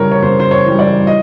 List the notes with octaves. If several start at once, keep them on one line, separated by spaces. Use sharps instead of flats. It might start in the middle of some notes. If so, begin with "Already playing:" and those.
Already playing: C#3 E3 G3 A#4 C#5
C#5
C#3 C5
C5
C#5
E3 G3
D5
D#5